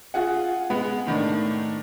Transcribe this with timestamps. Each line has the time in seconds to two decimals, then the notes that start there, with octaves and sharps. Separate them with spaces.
0.14 F4 G#4 F#5
0.70 G#3 B3 F#5 B5
1.06 A2 D#3 D4